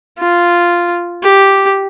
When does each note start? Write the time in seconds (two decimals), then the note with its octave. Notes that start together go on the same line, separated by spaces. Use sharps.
0.18 F4
1.23 G4